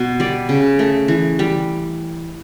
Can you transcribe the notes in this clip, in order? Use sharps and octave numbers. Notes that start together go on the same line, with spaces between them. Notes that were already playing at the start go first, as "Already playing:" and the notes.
Already playing: B2
G3 D5
C#3
A3
E3
G3